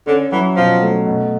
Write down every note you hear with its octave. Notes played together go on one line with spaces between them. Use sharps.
D3 C#4
E3 F#3
B2 F3
A3
B2